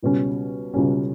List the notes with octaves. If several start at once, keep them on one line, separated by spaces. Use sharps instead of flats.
C#2 B2 G3 C#4
C#2 B2 G3 C#4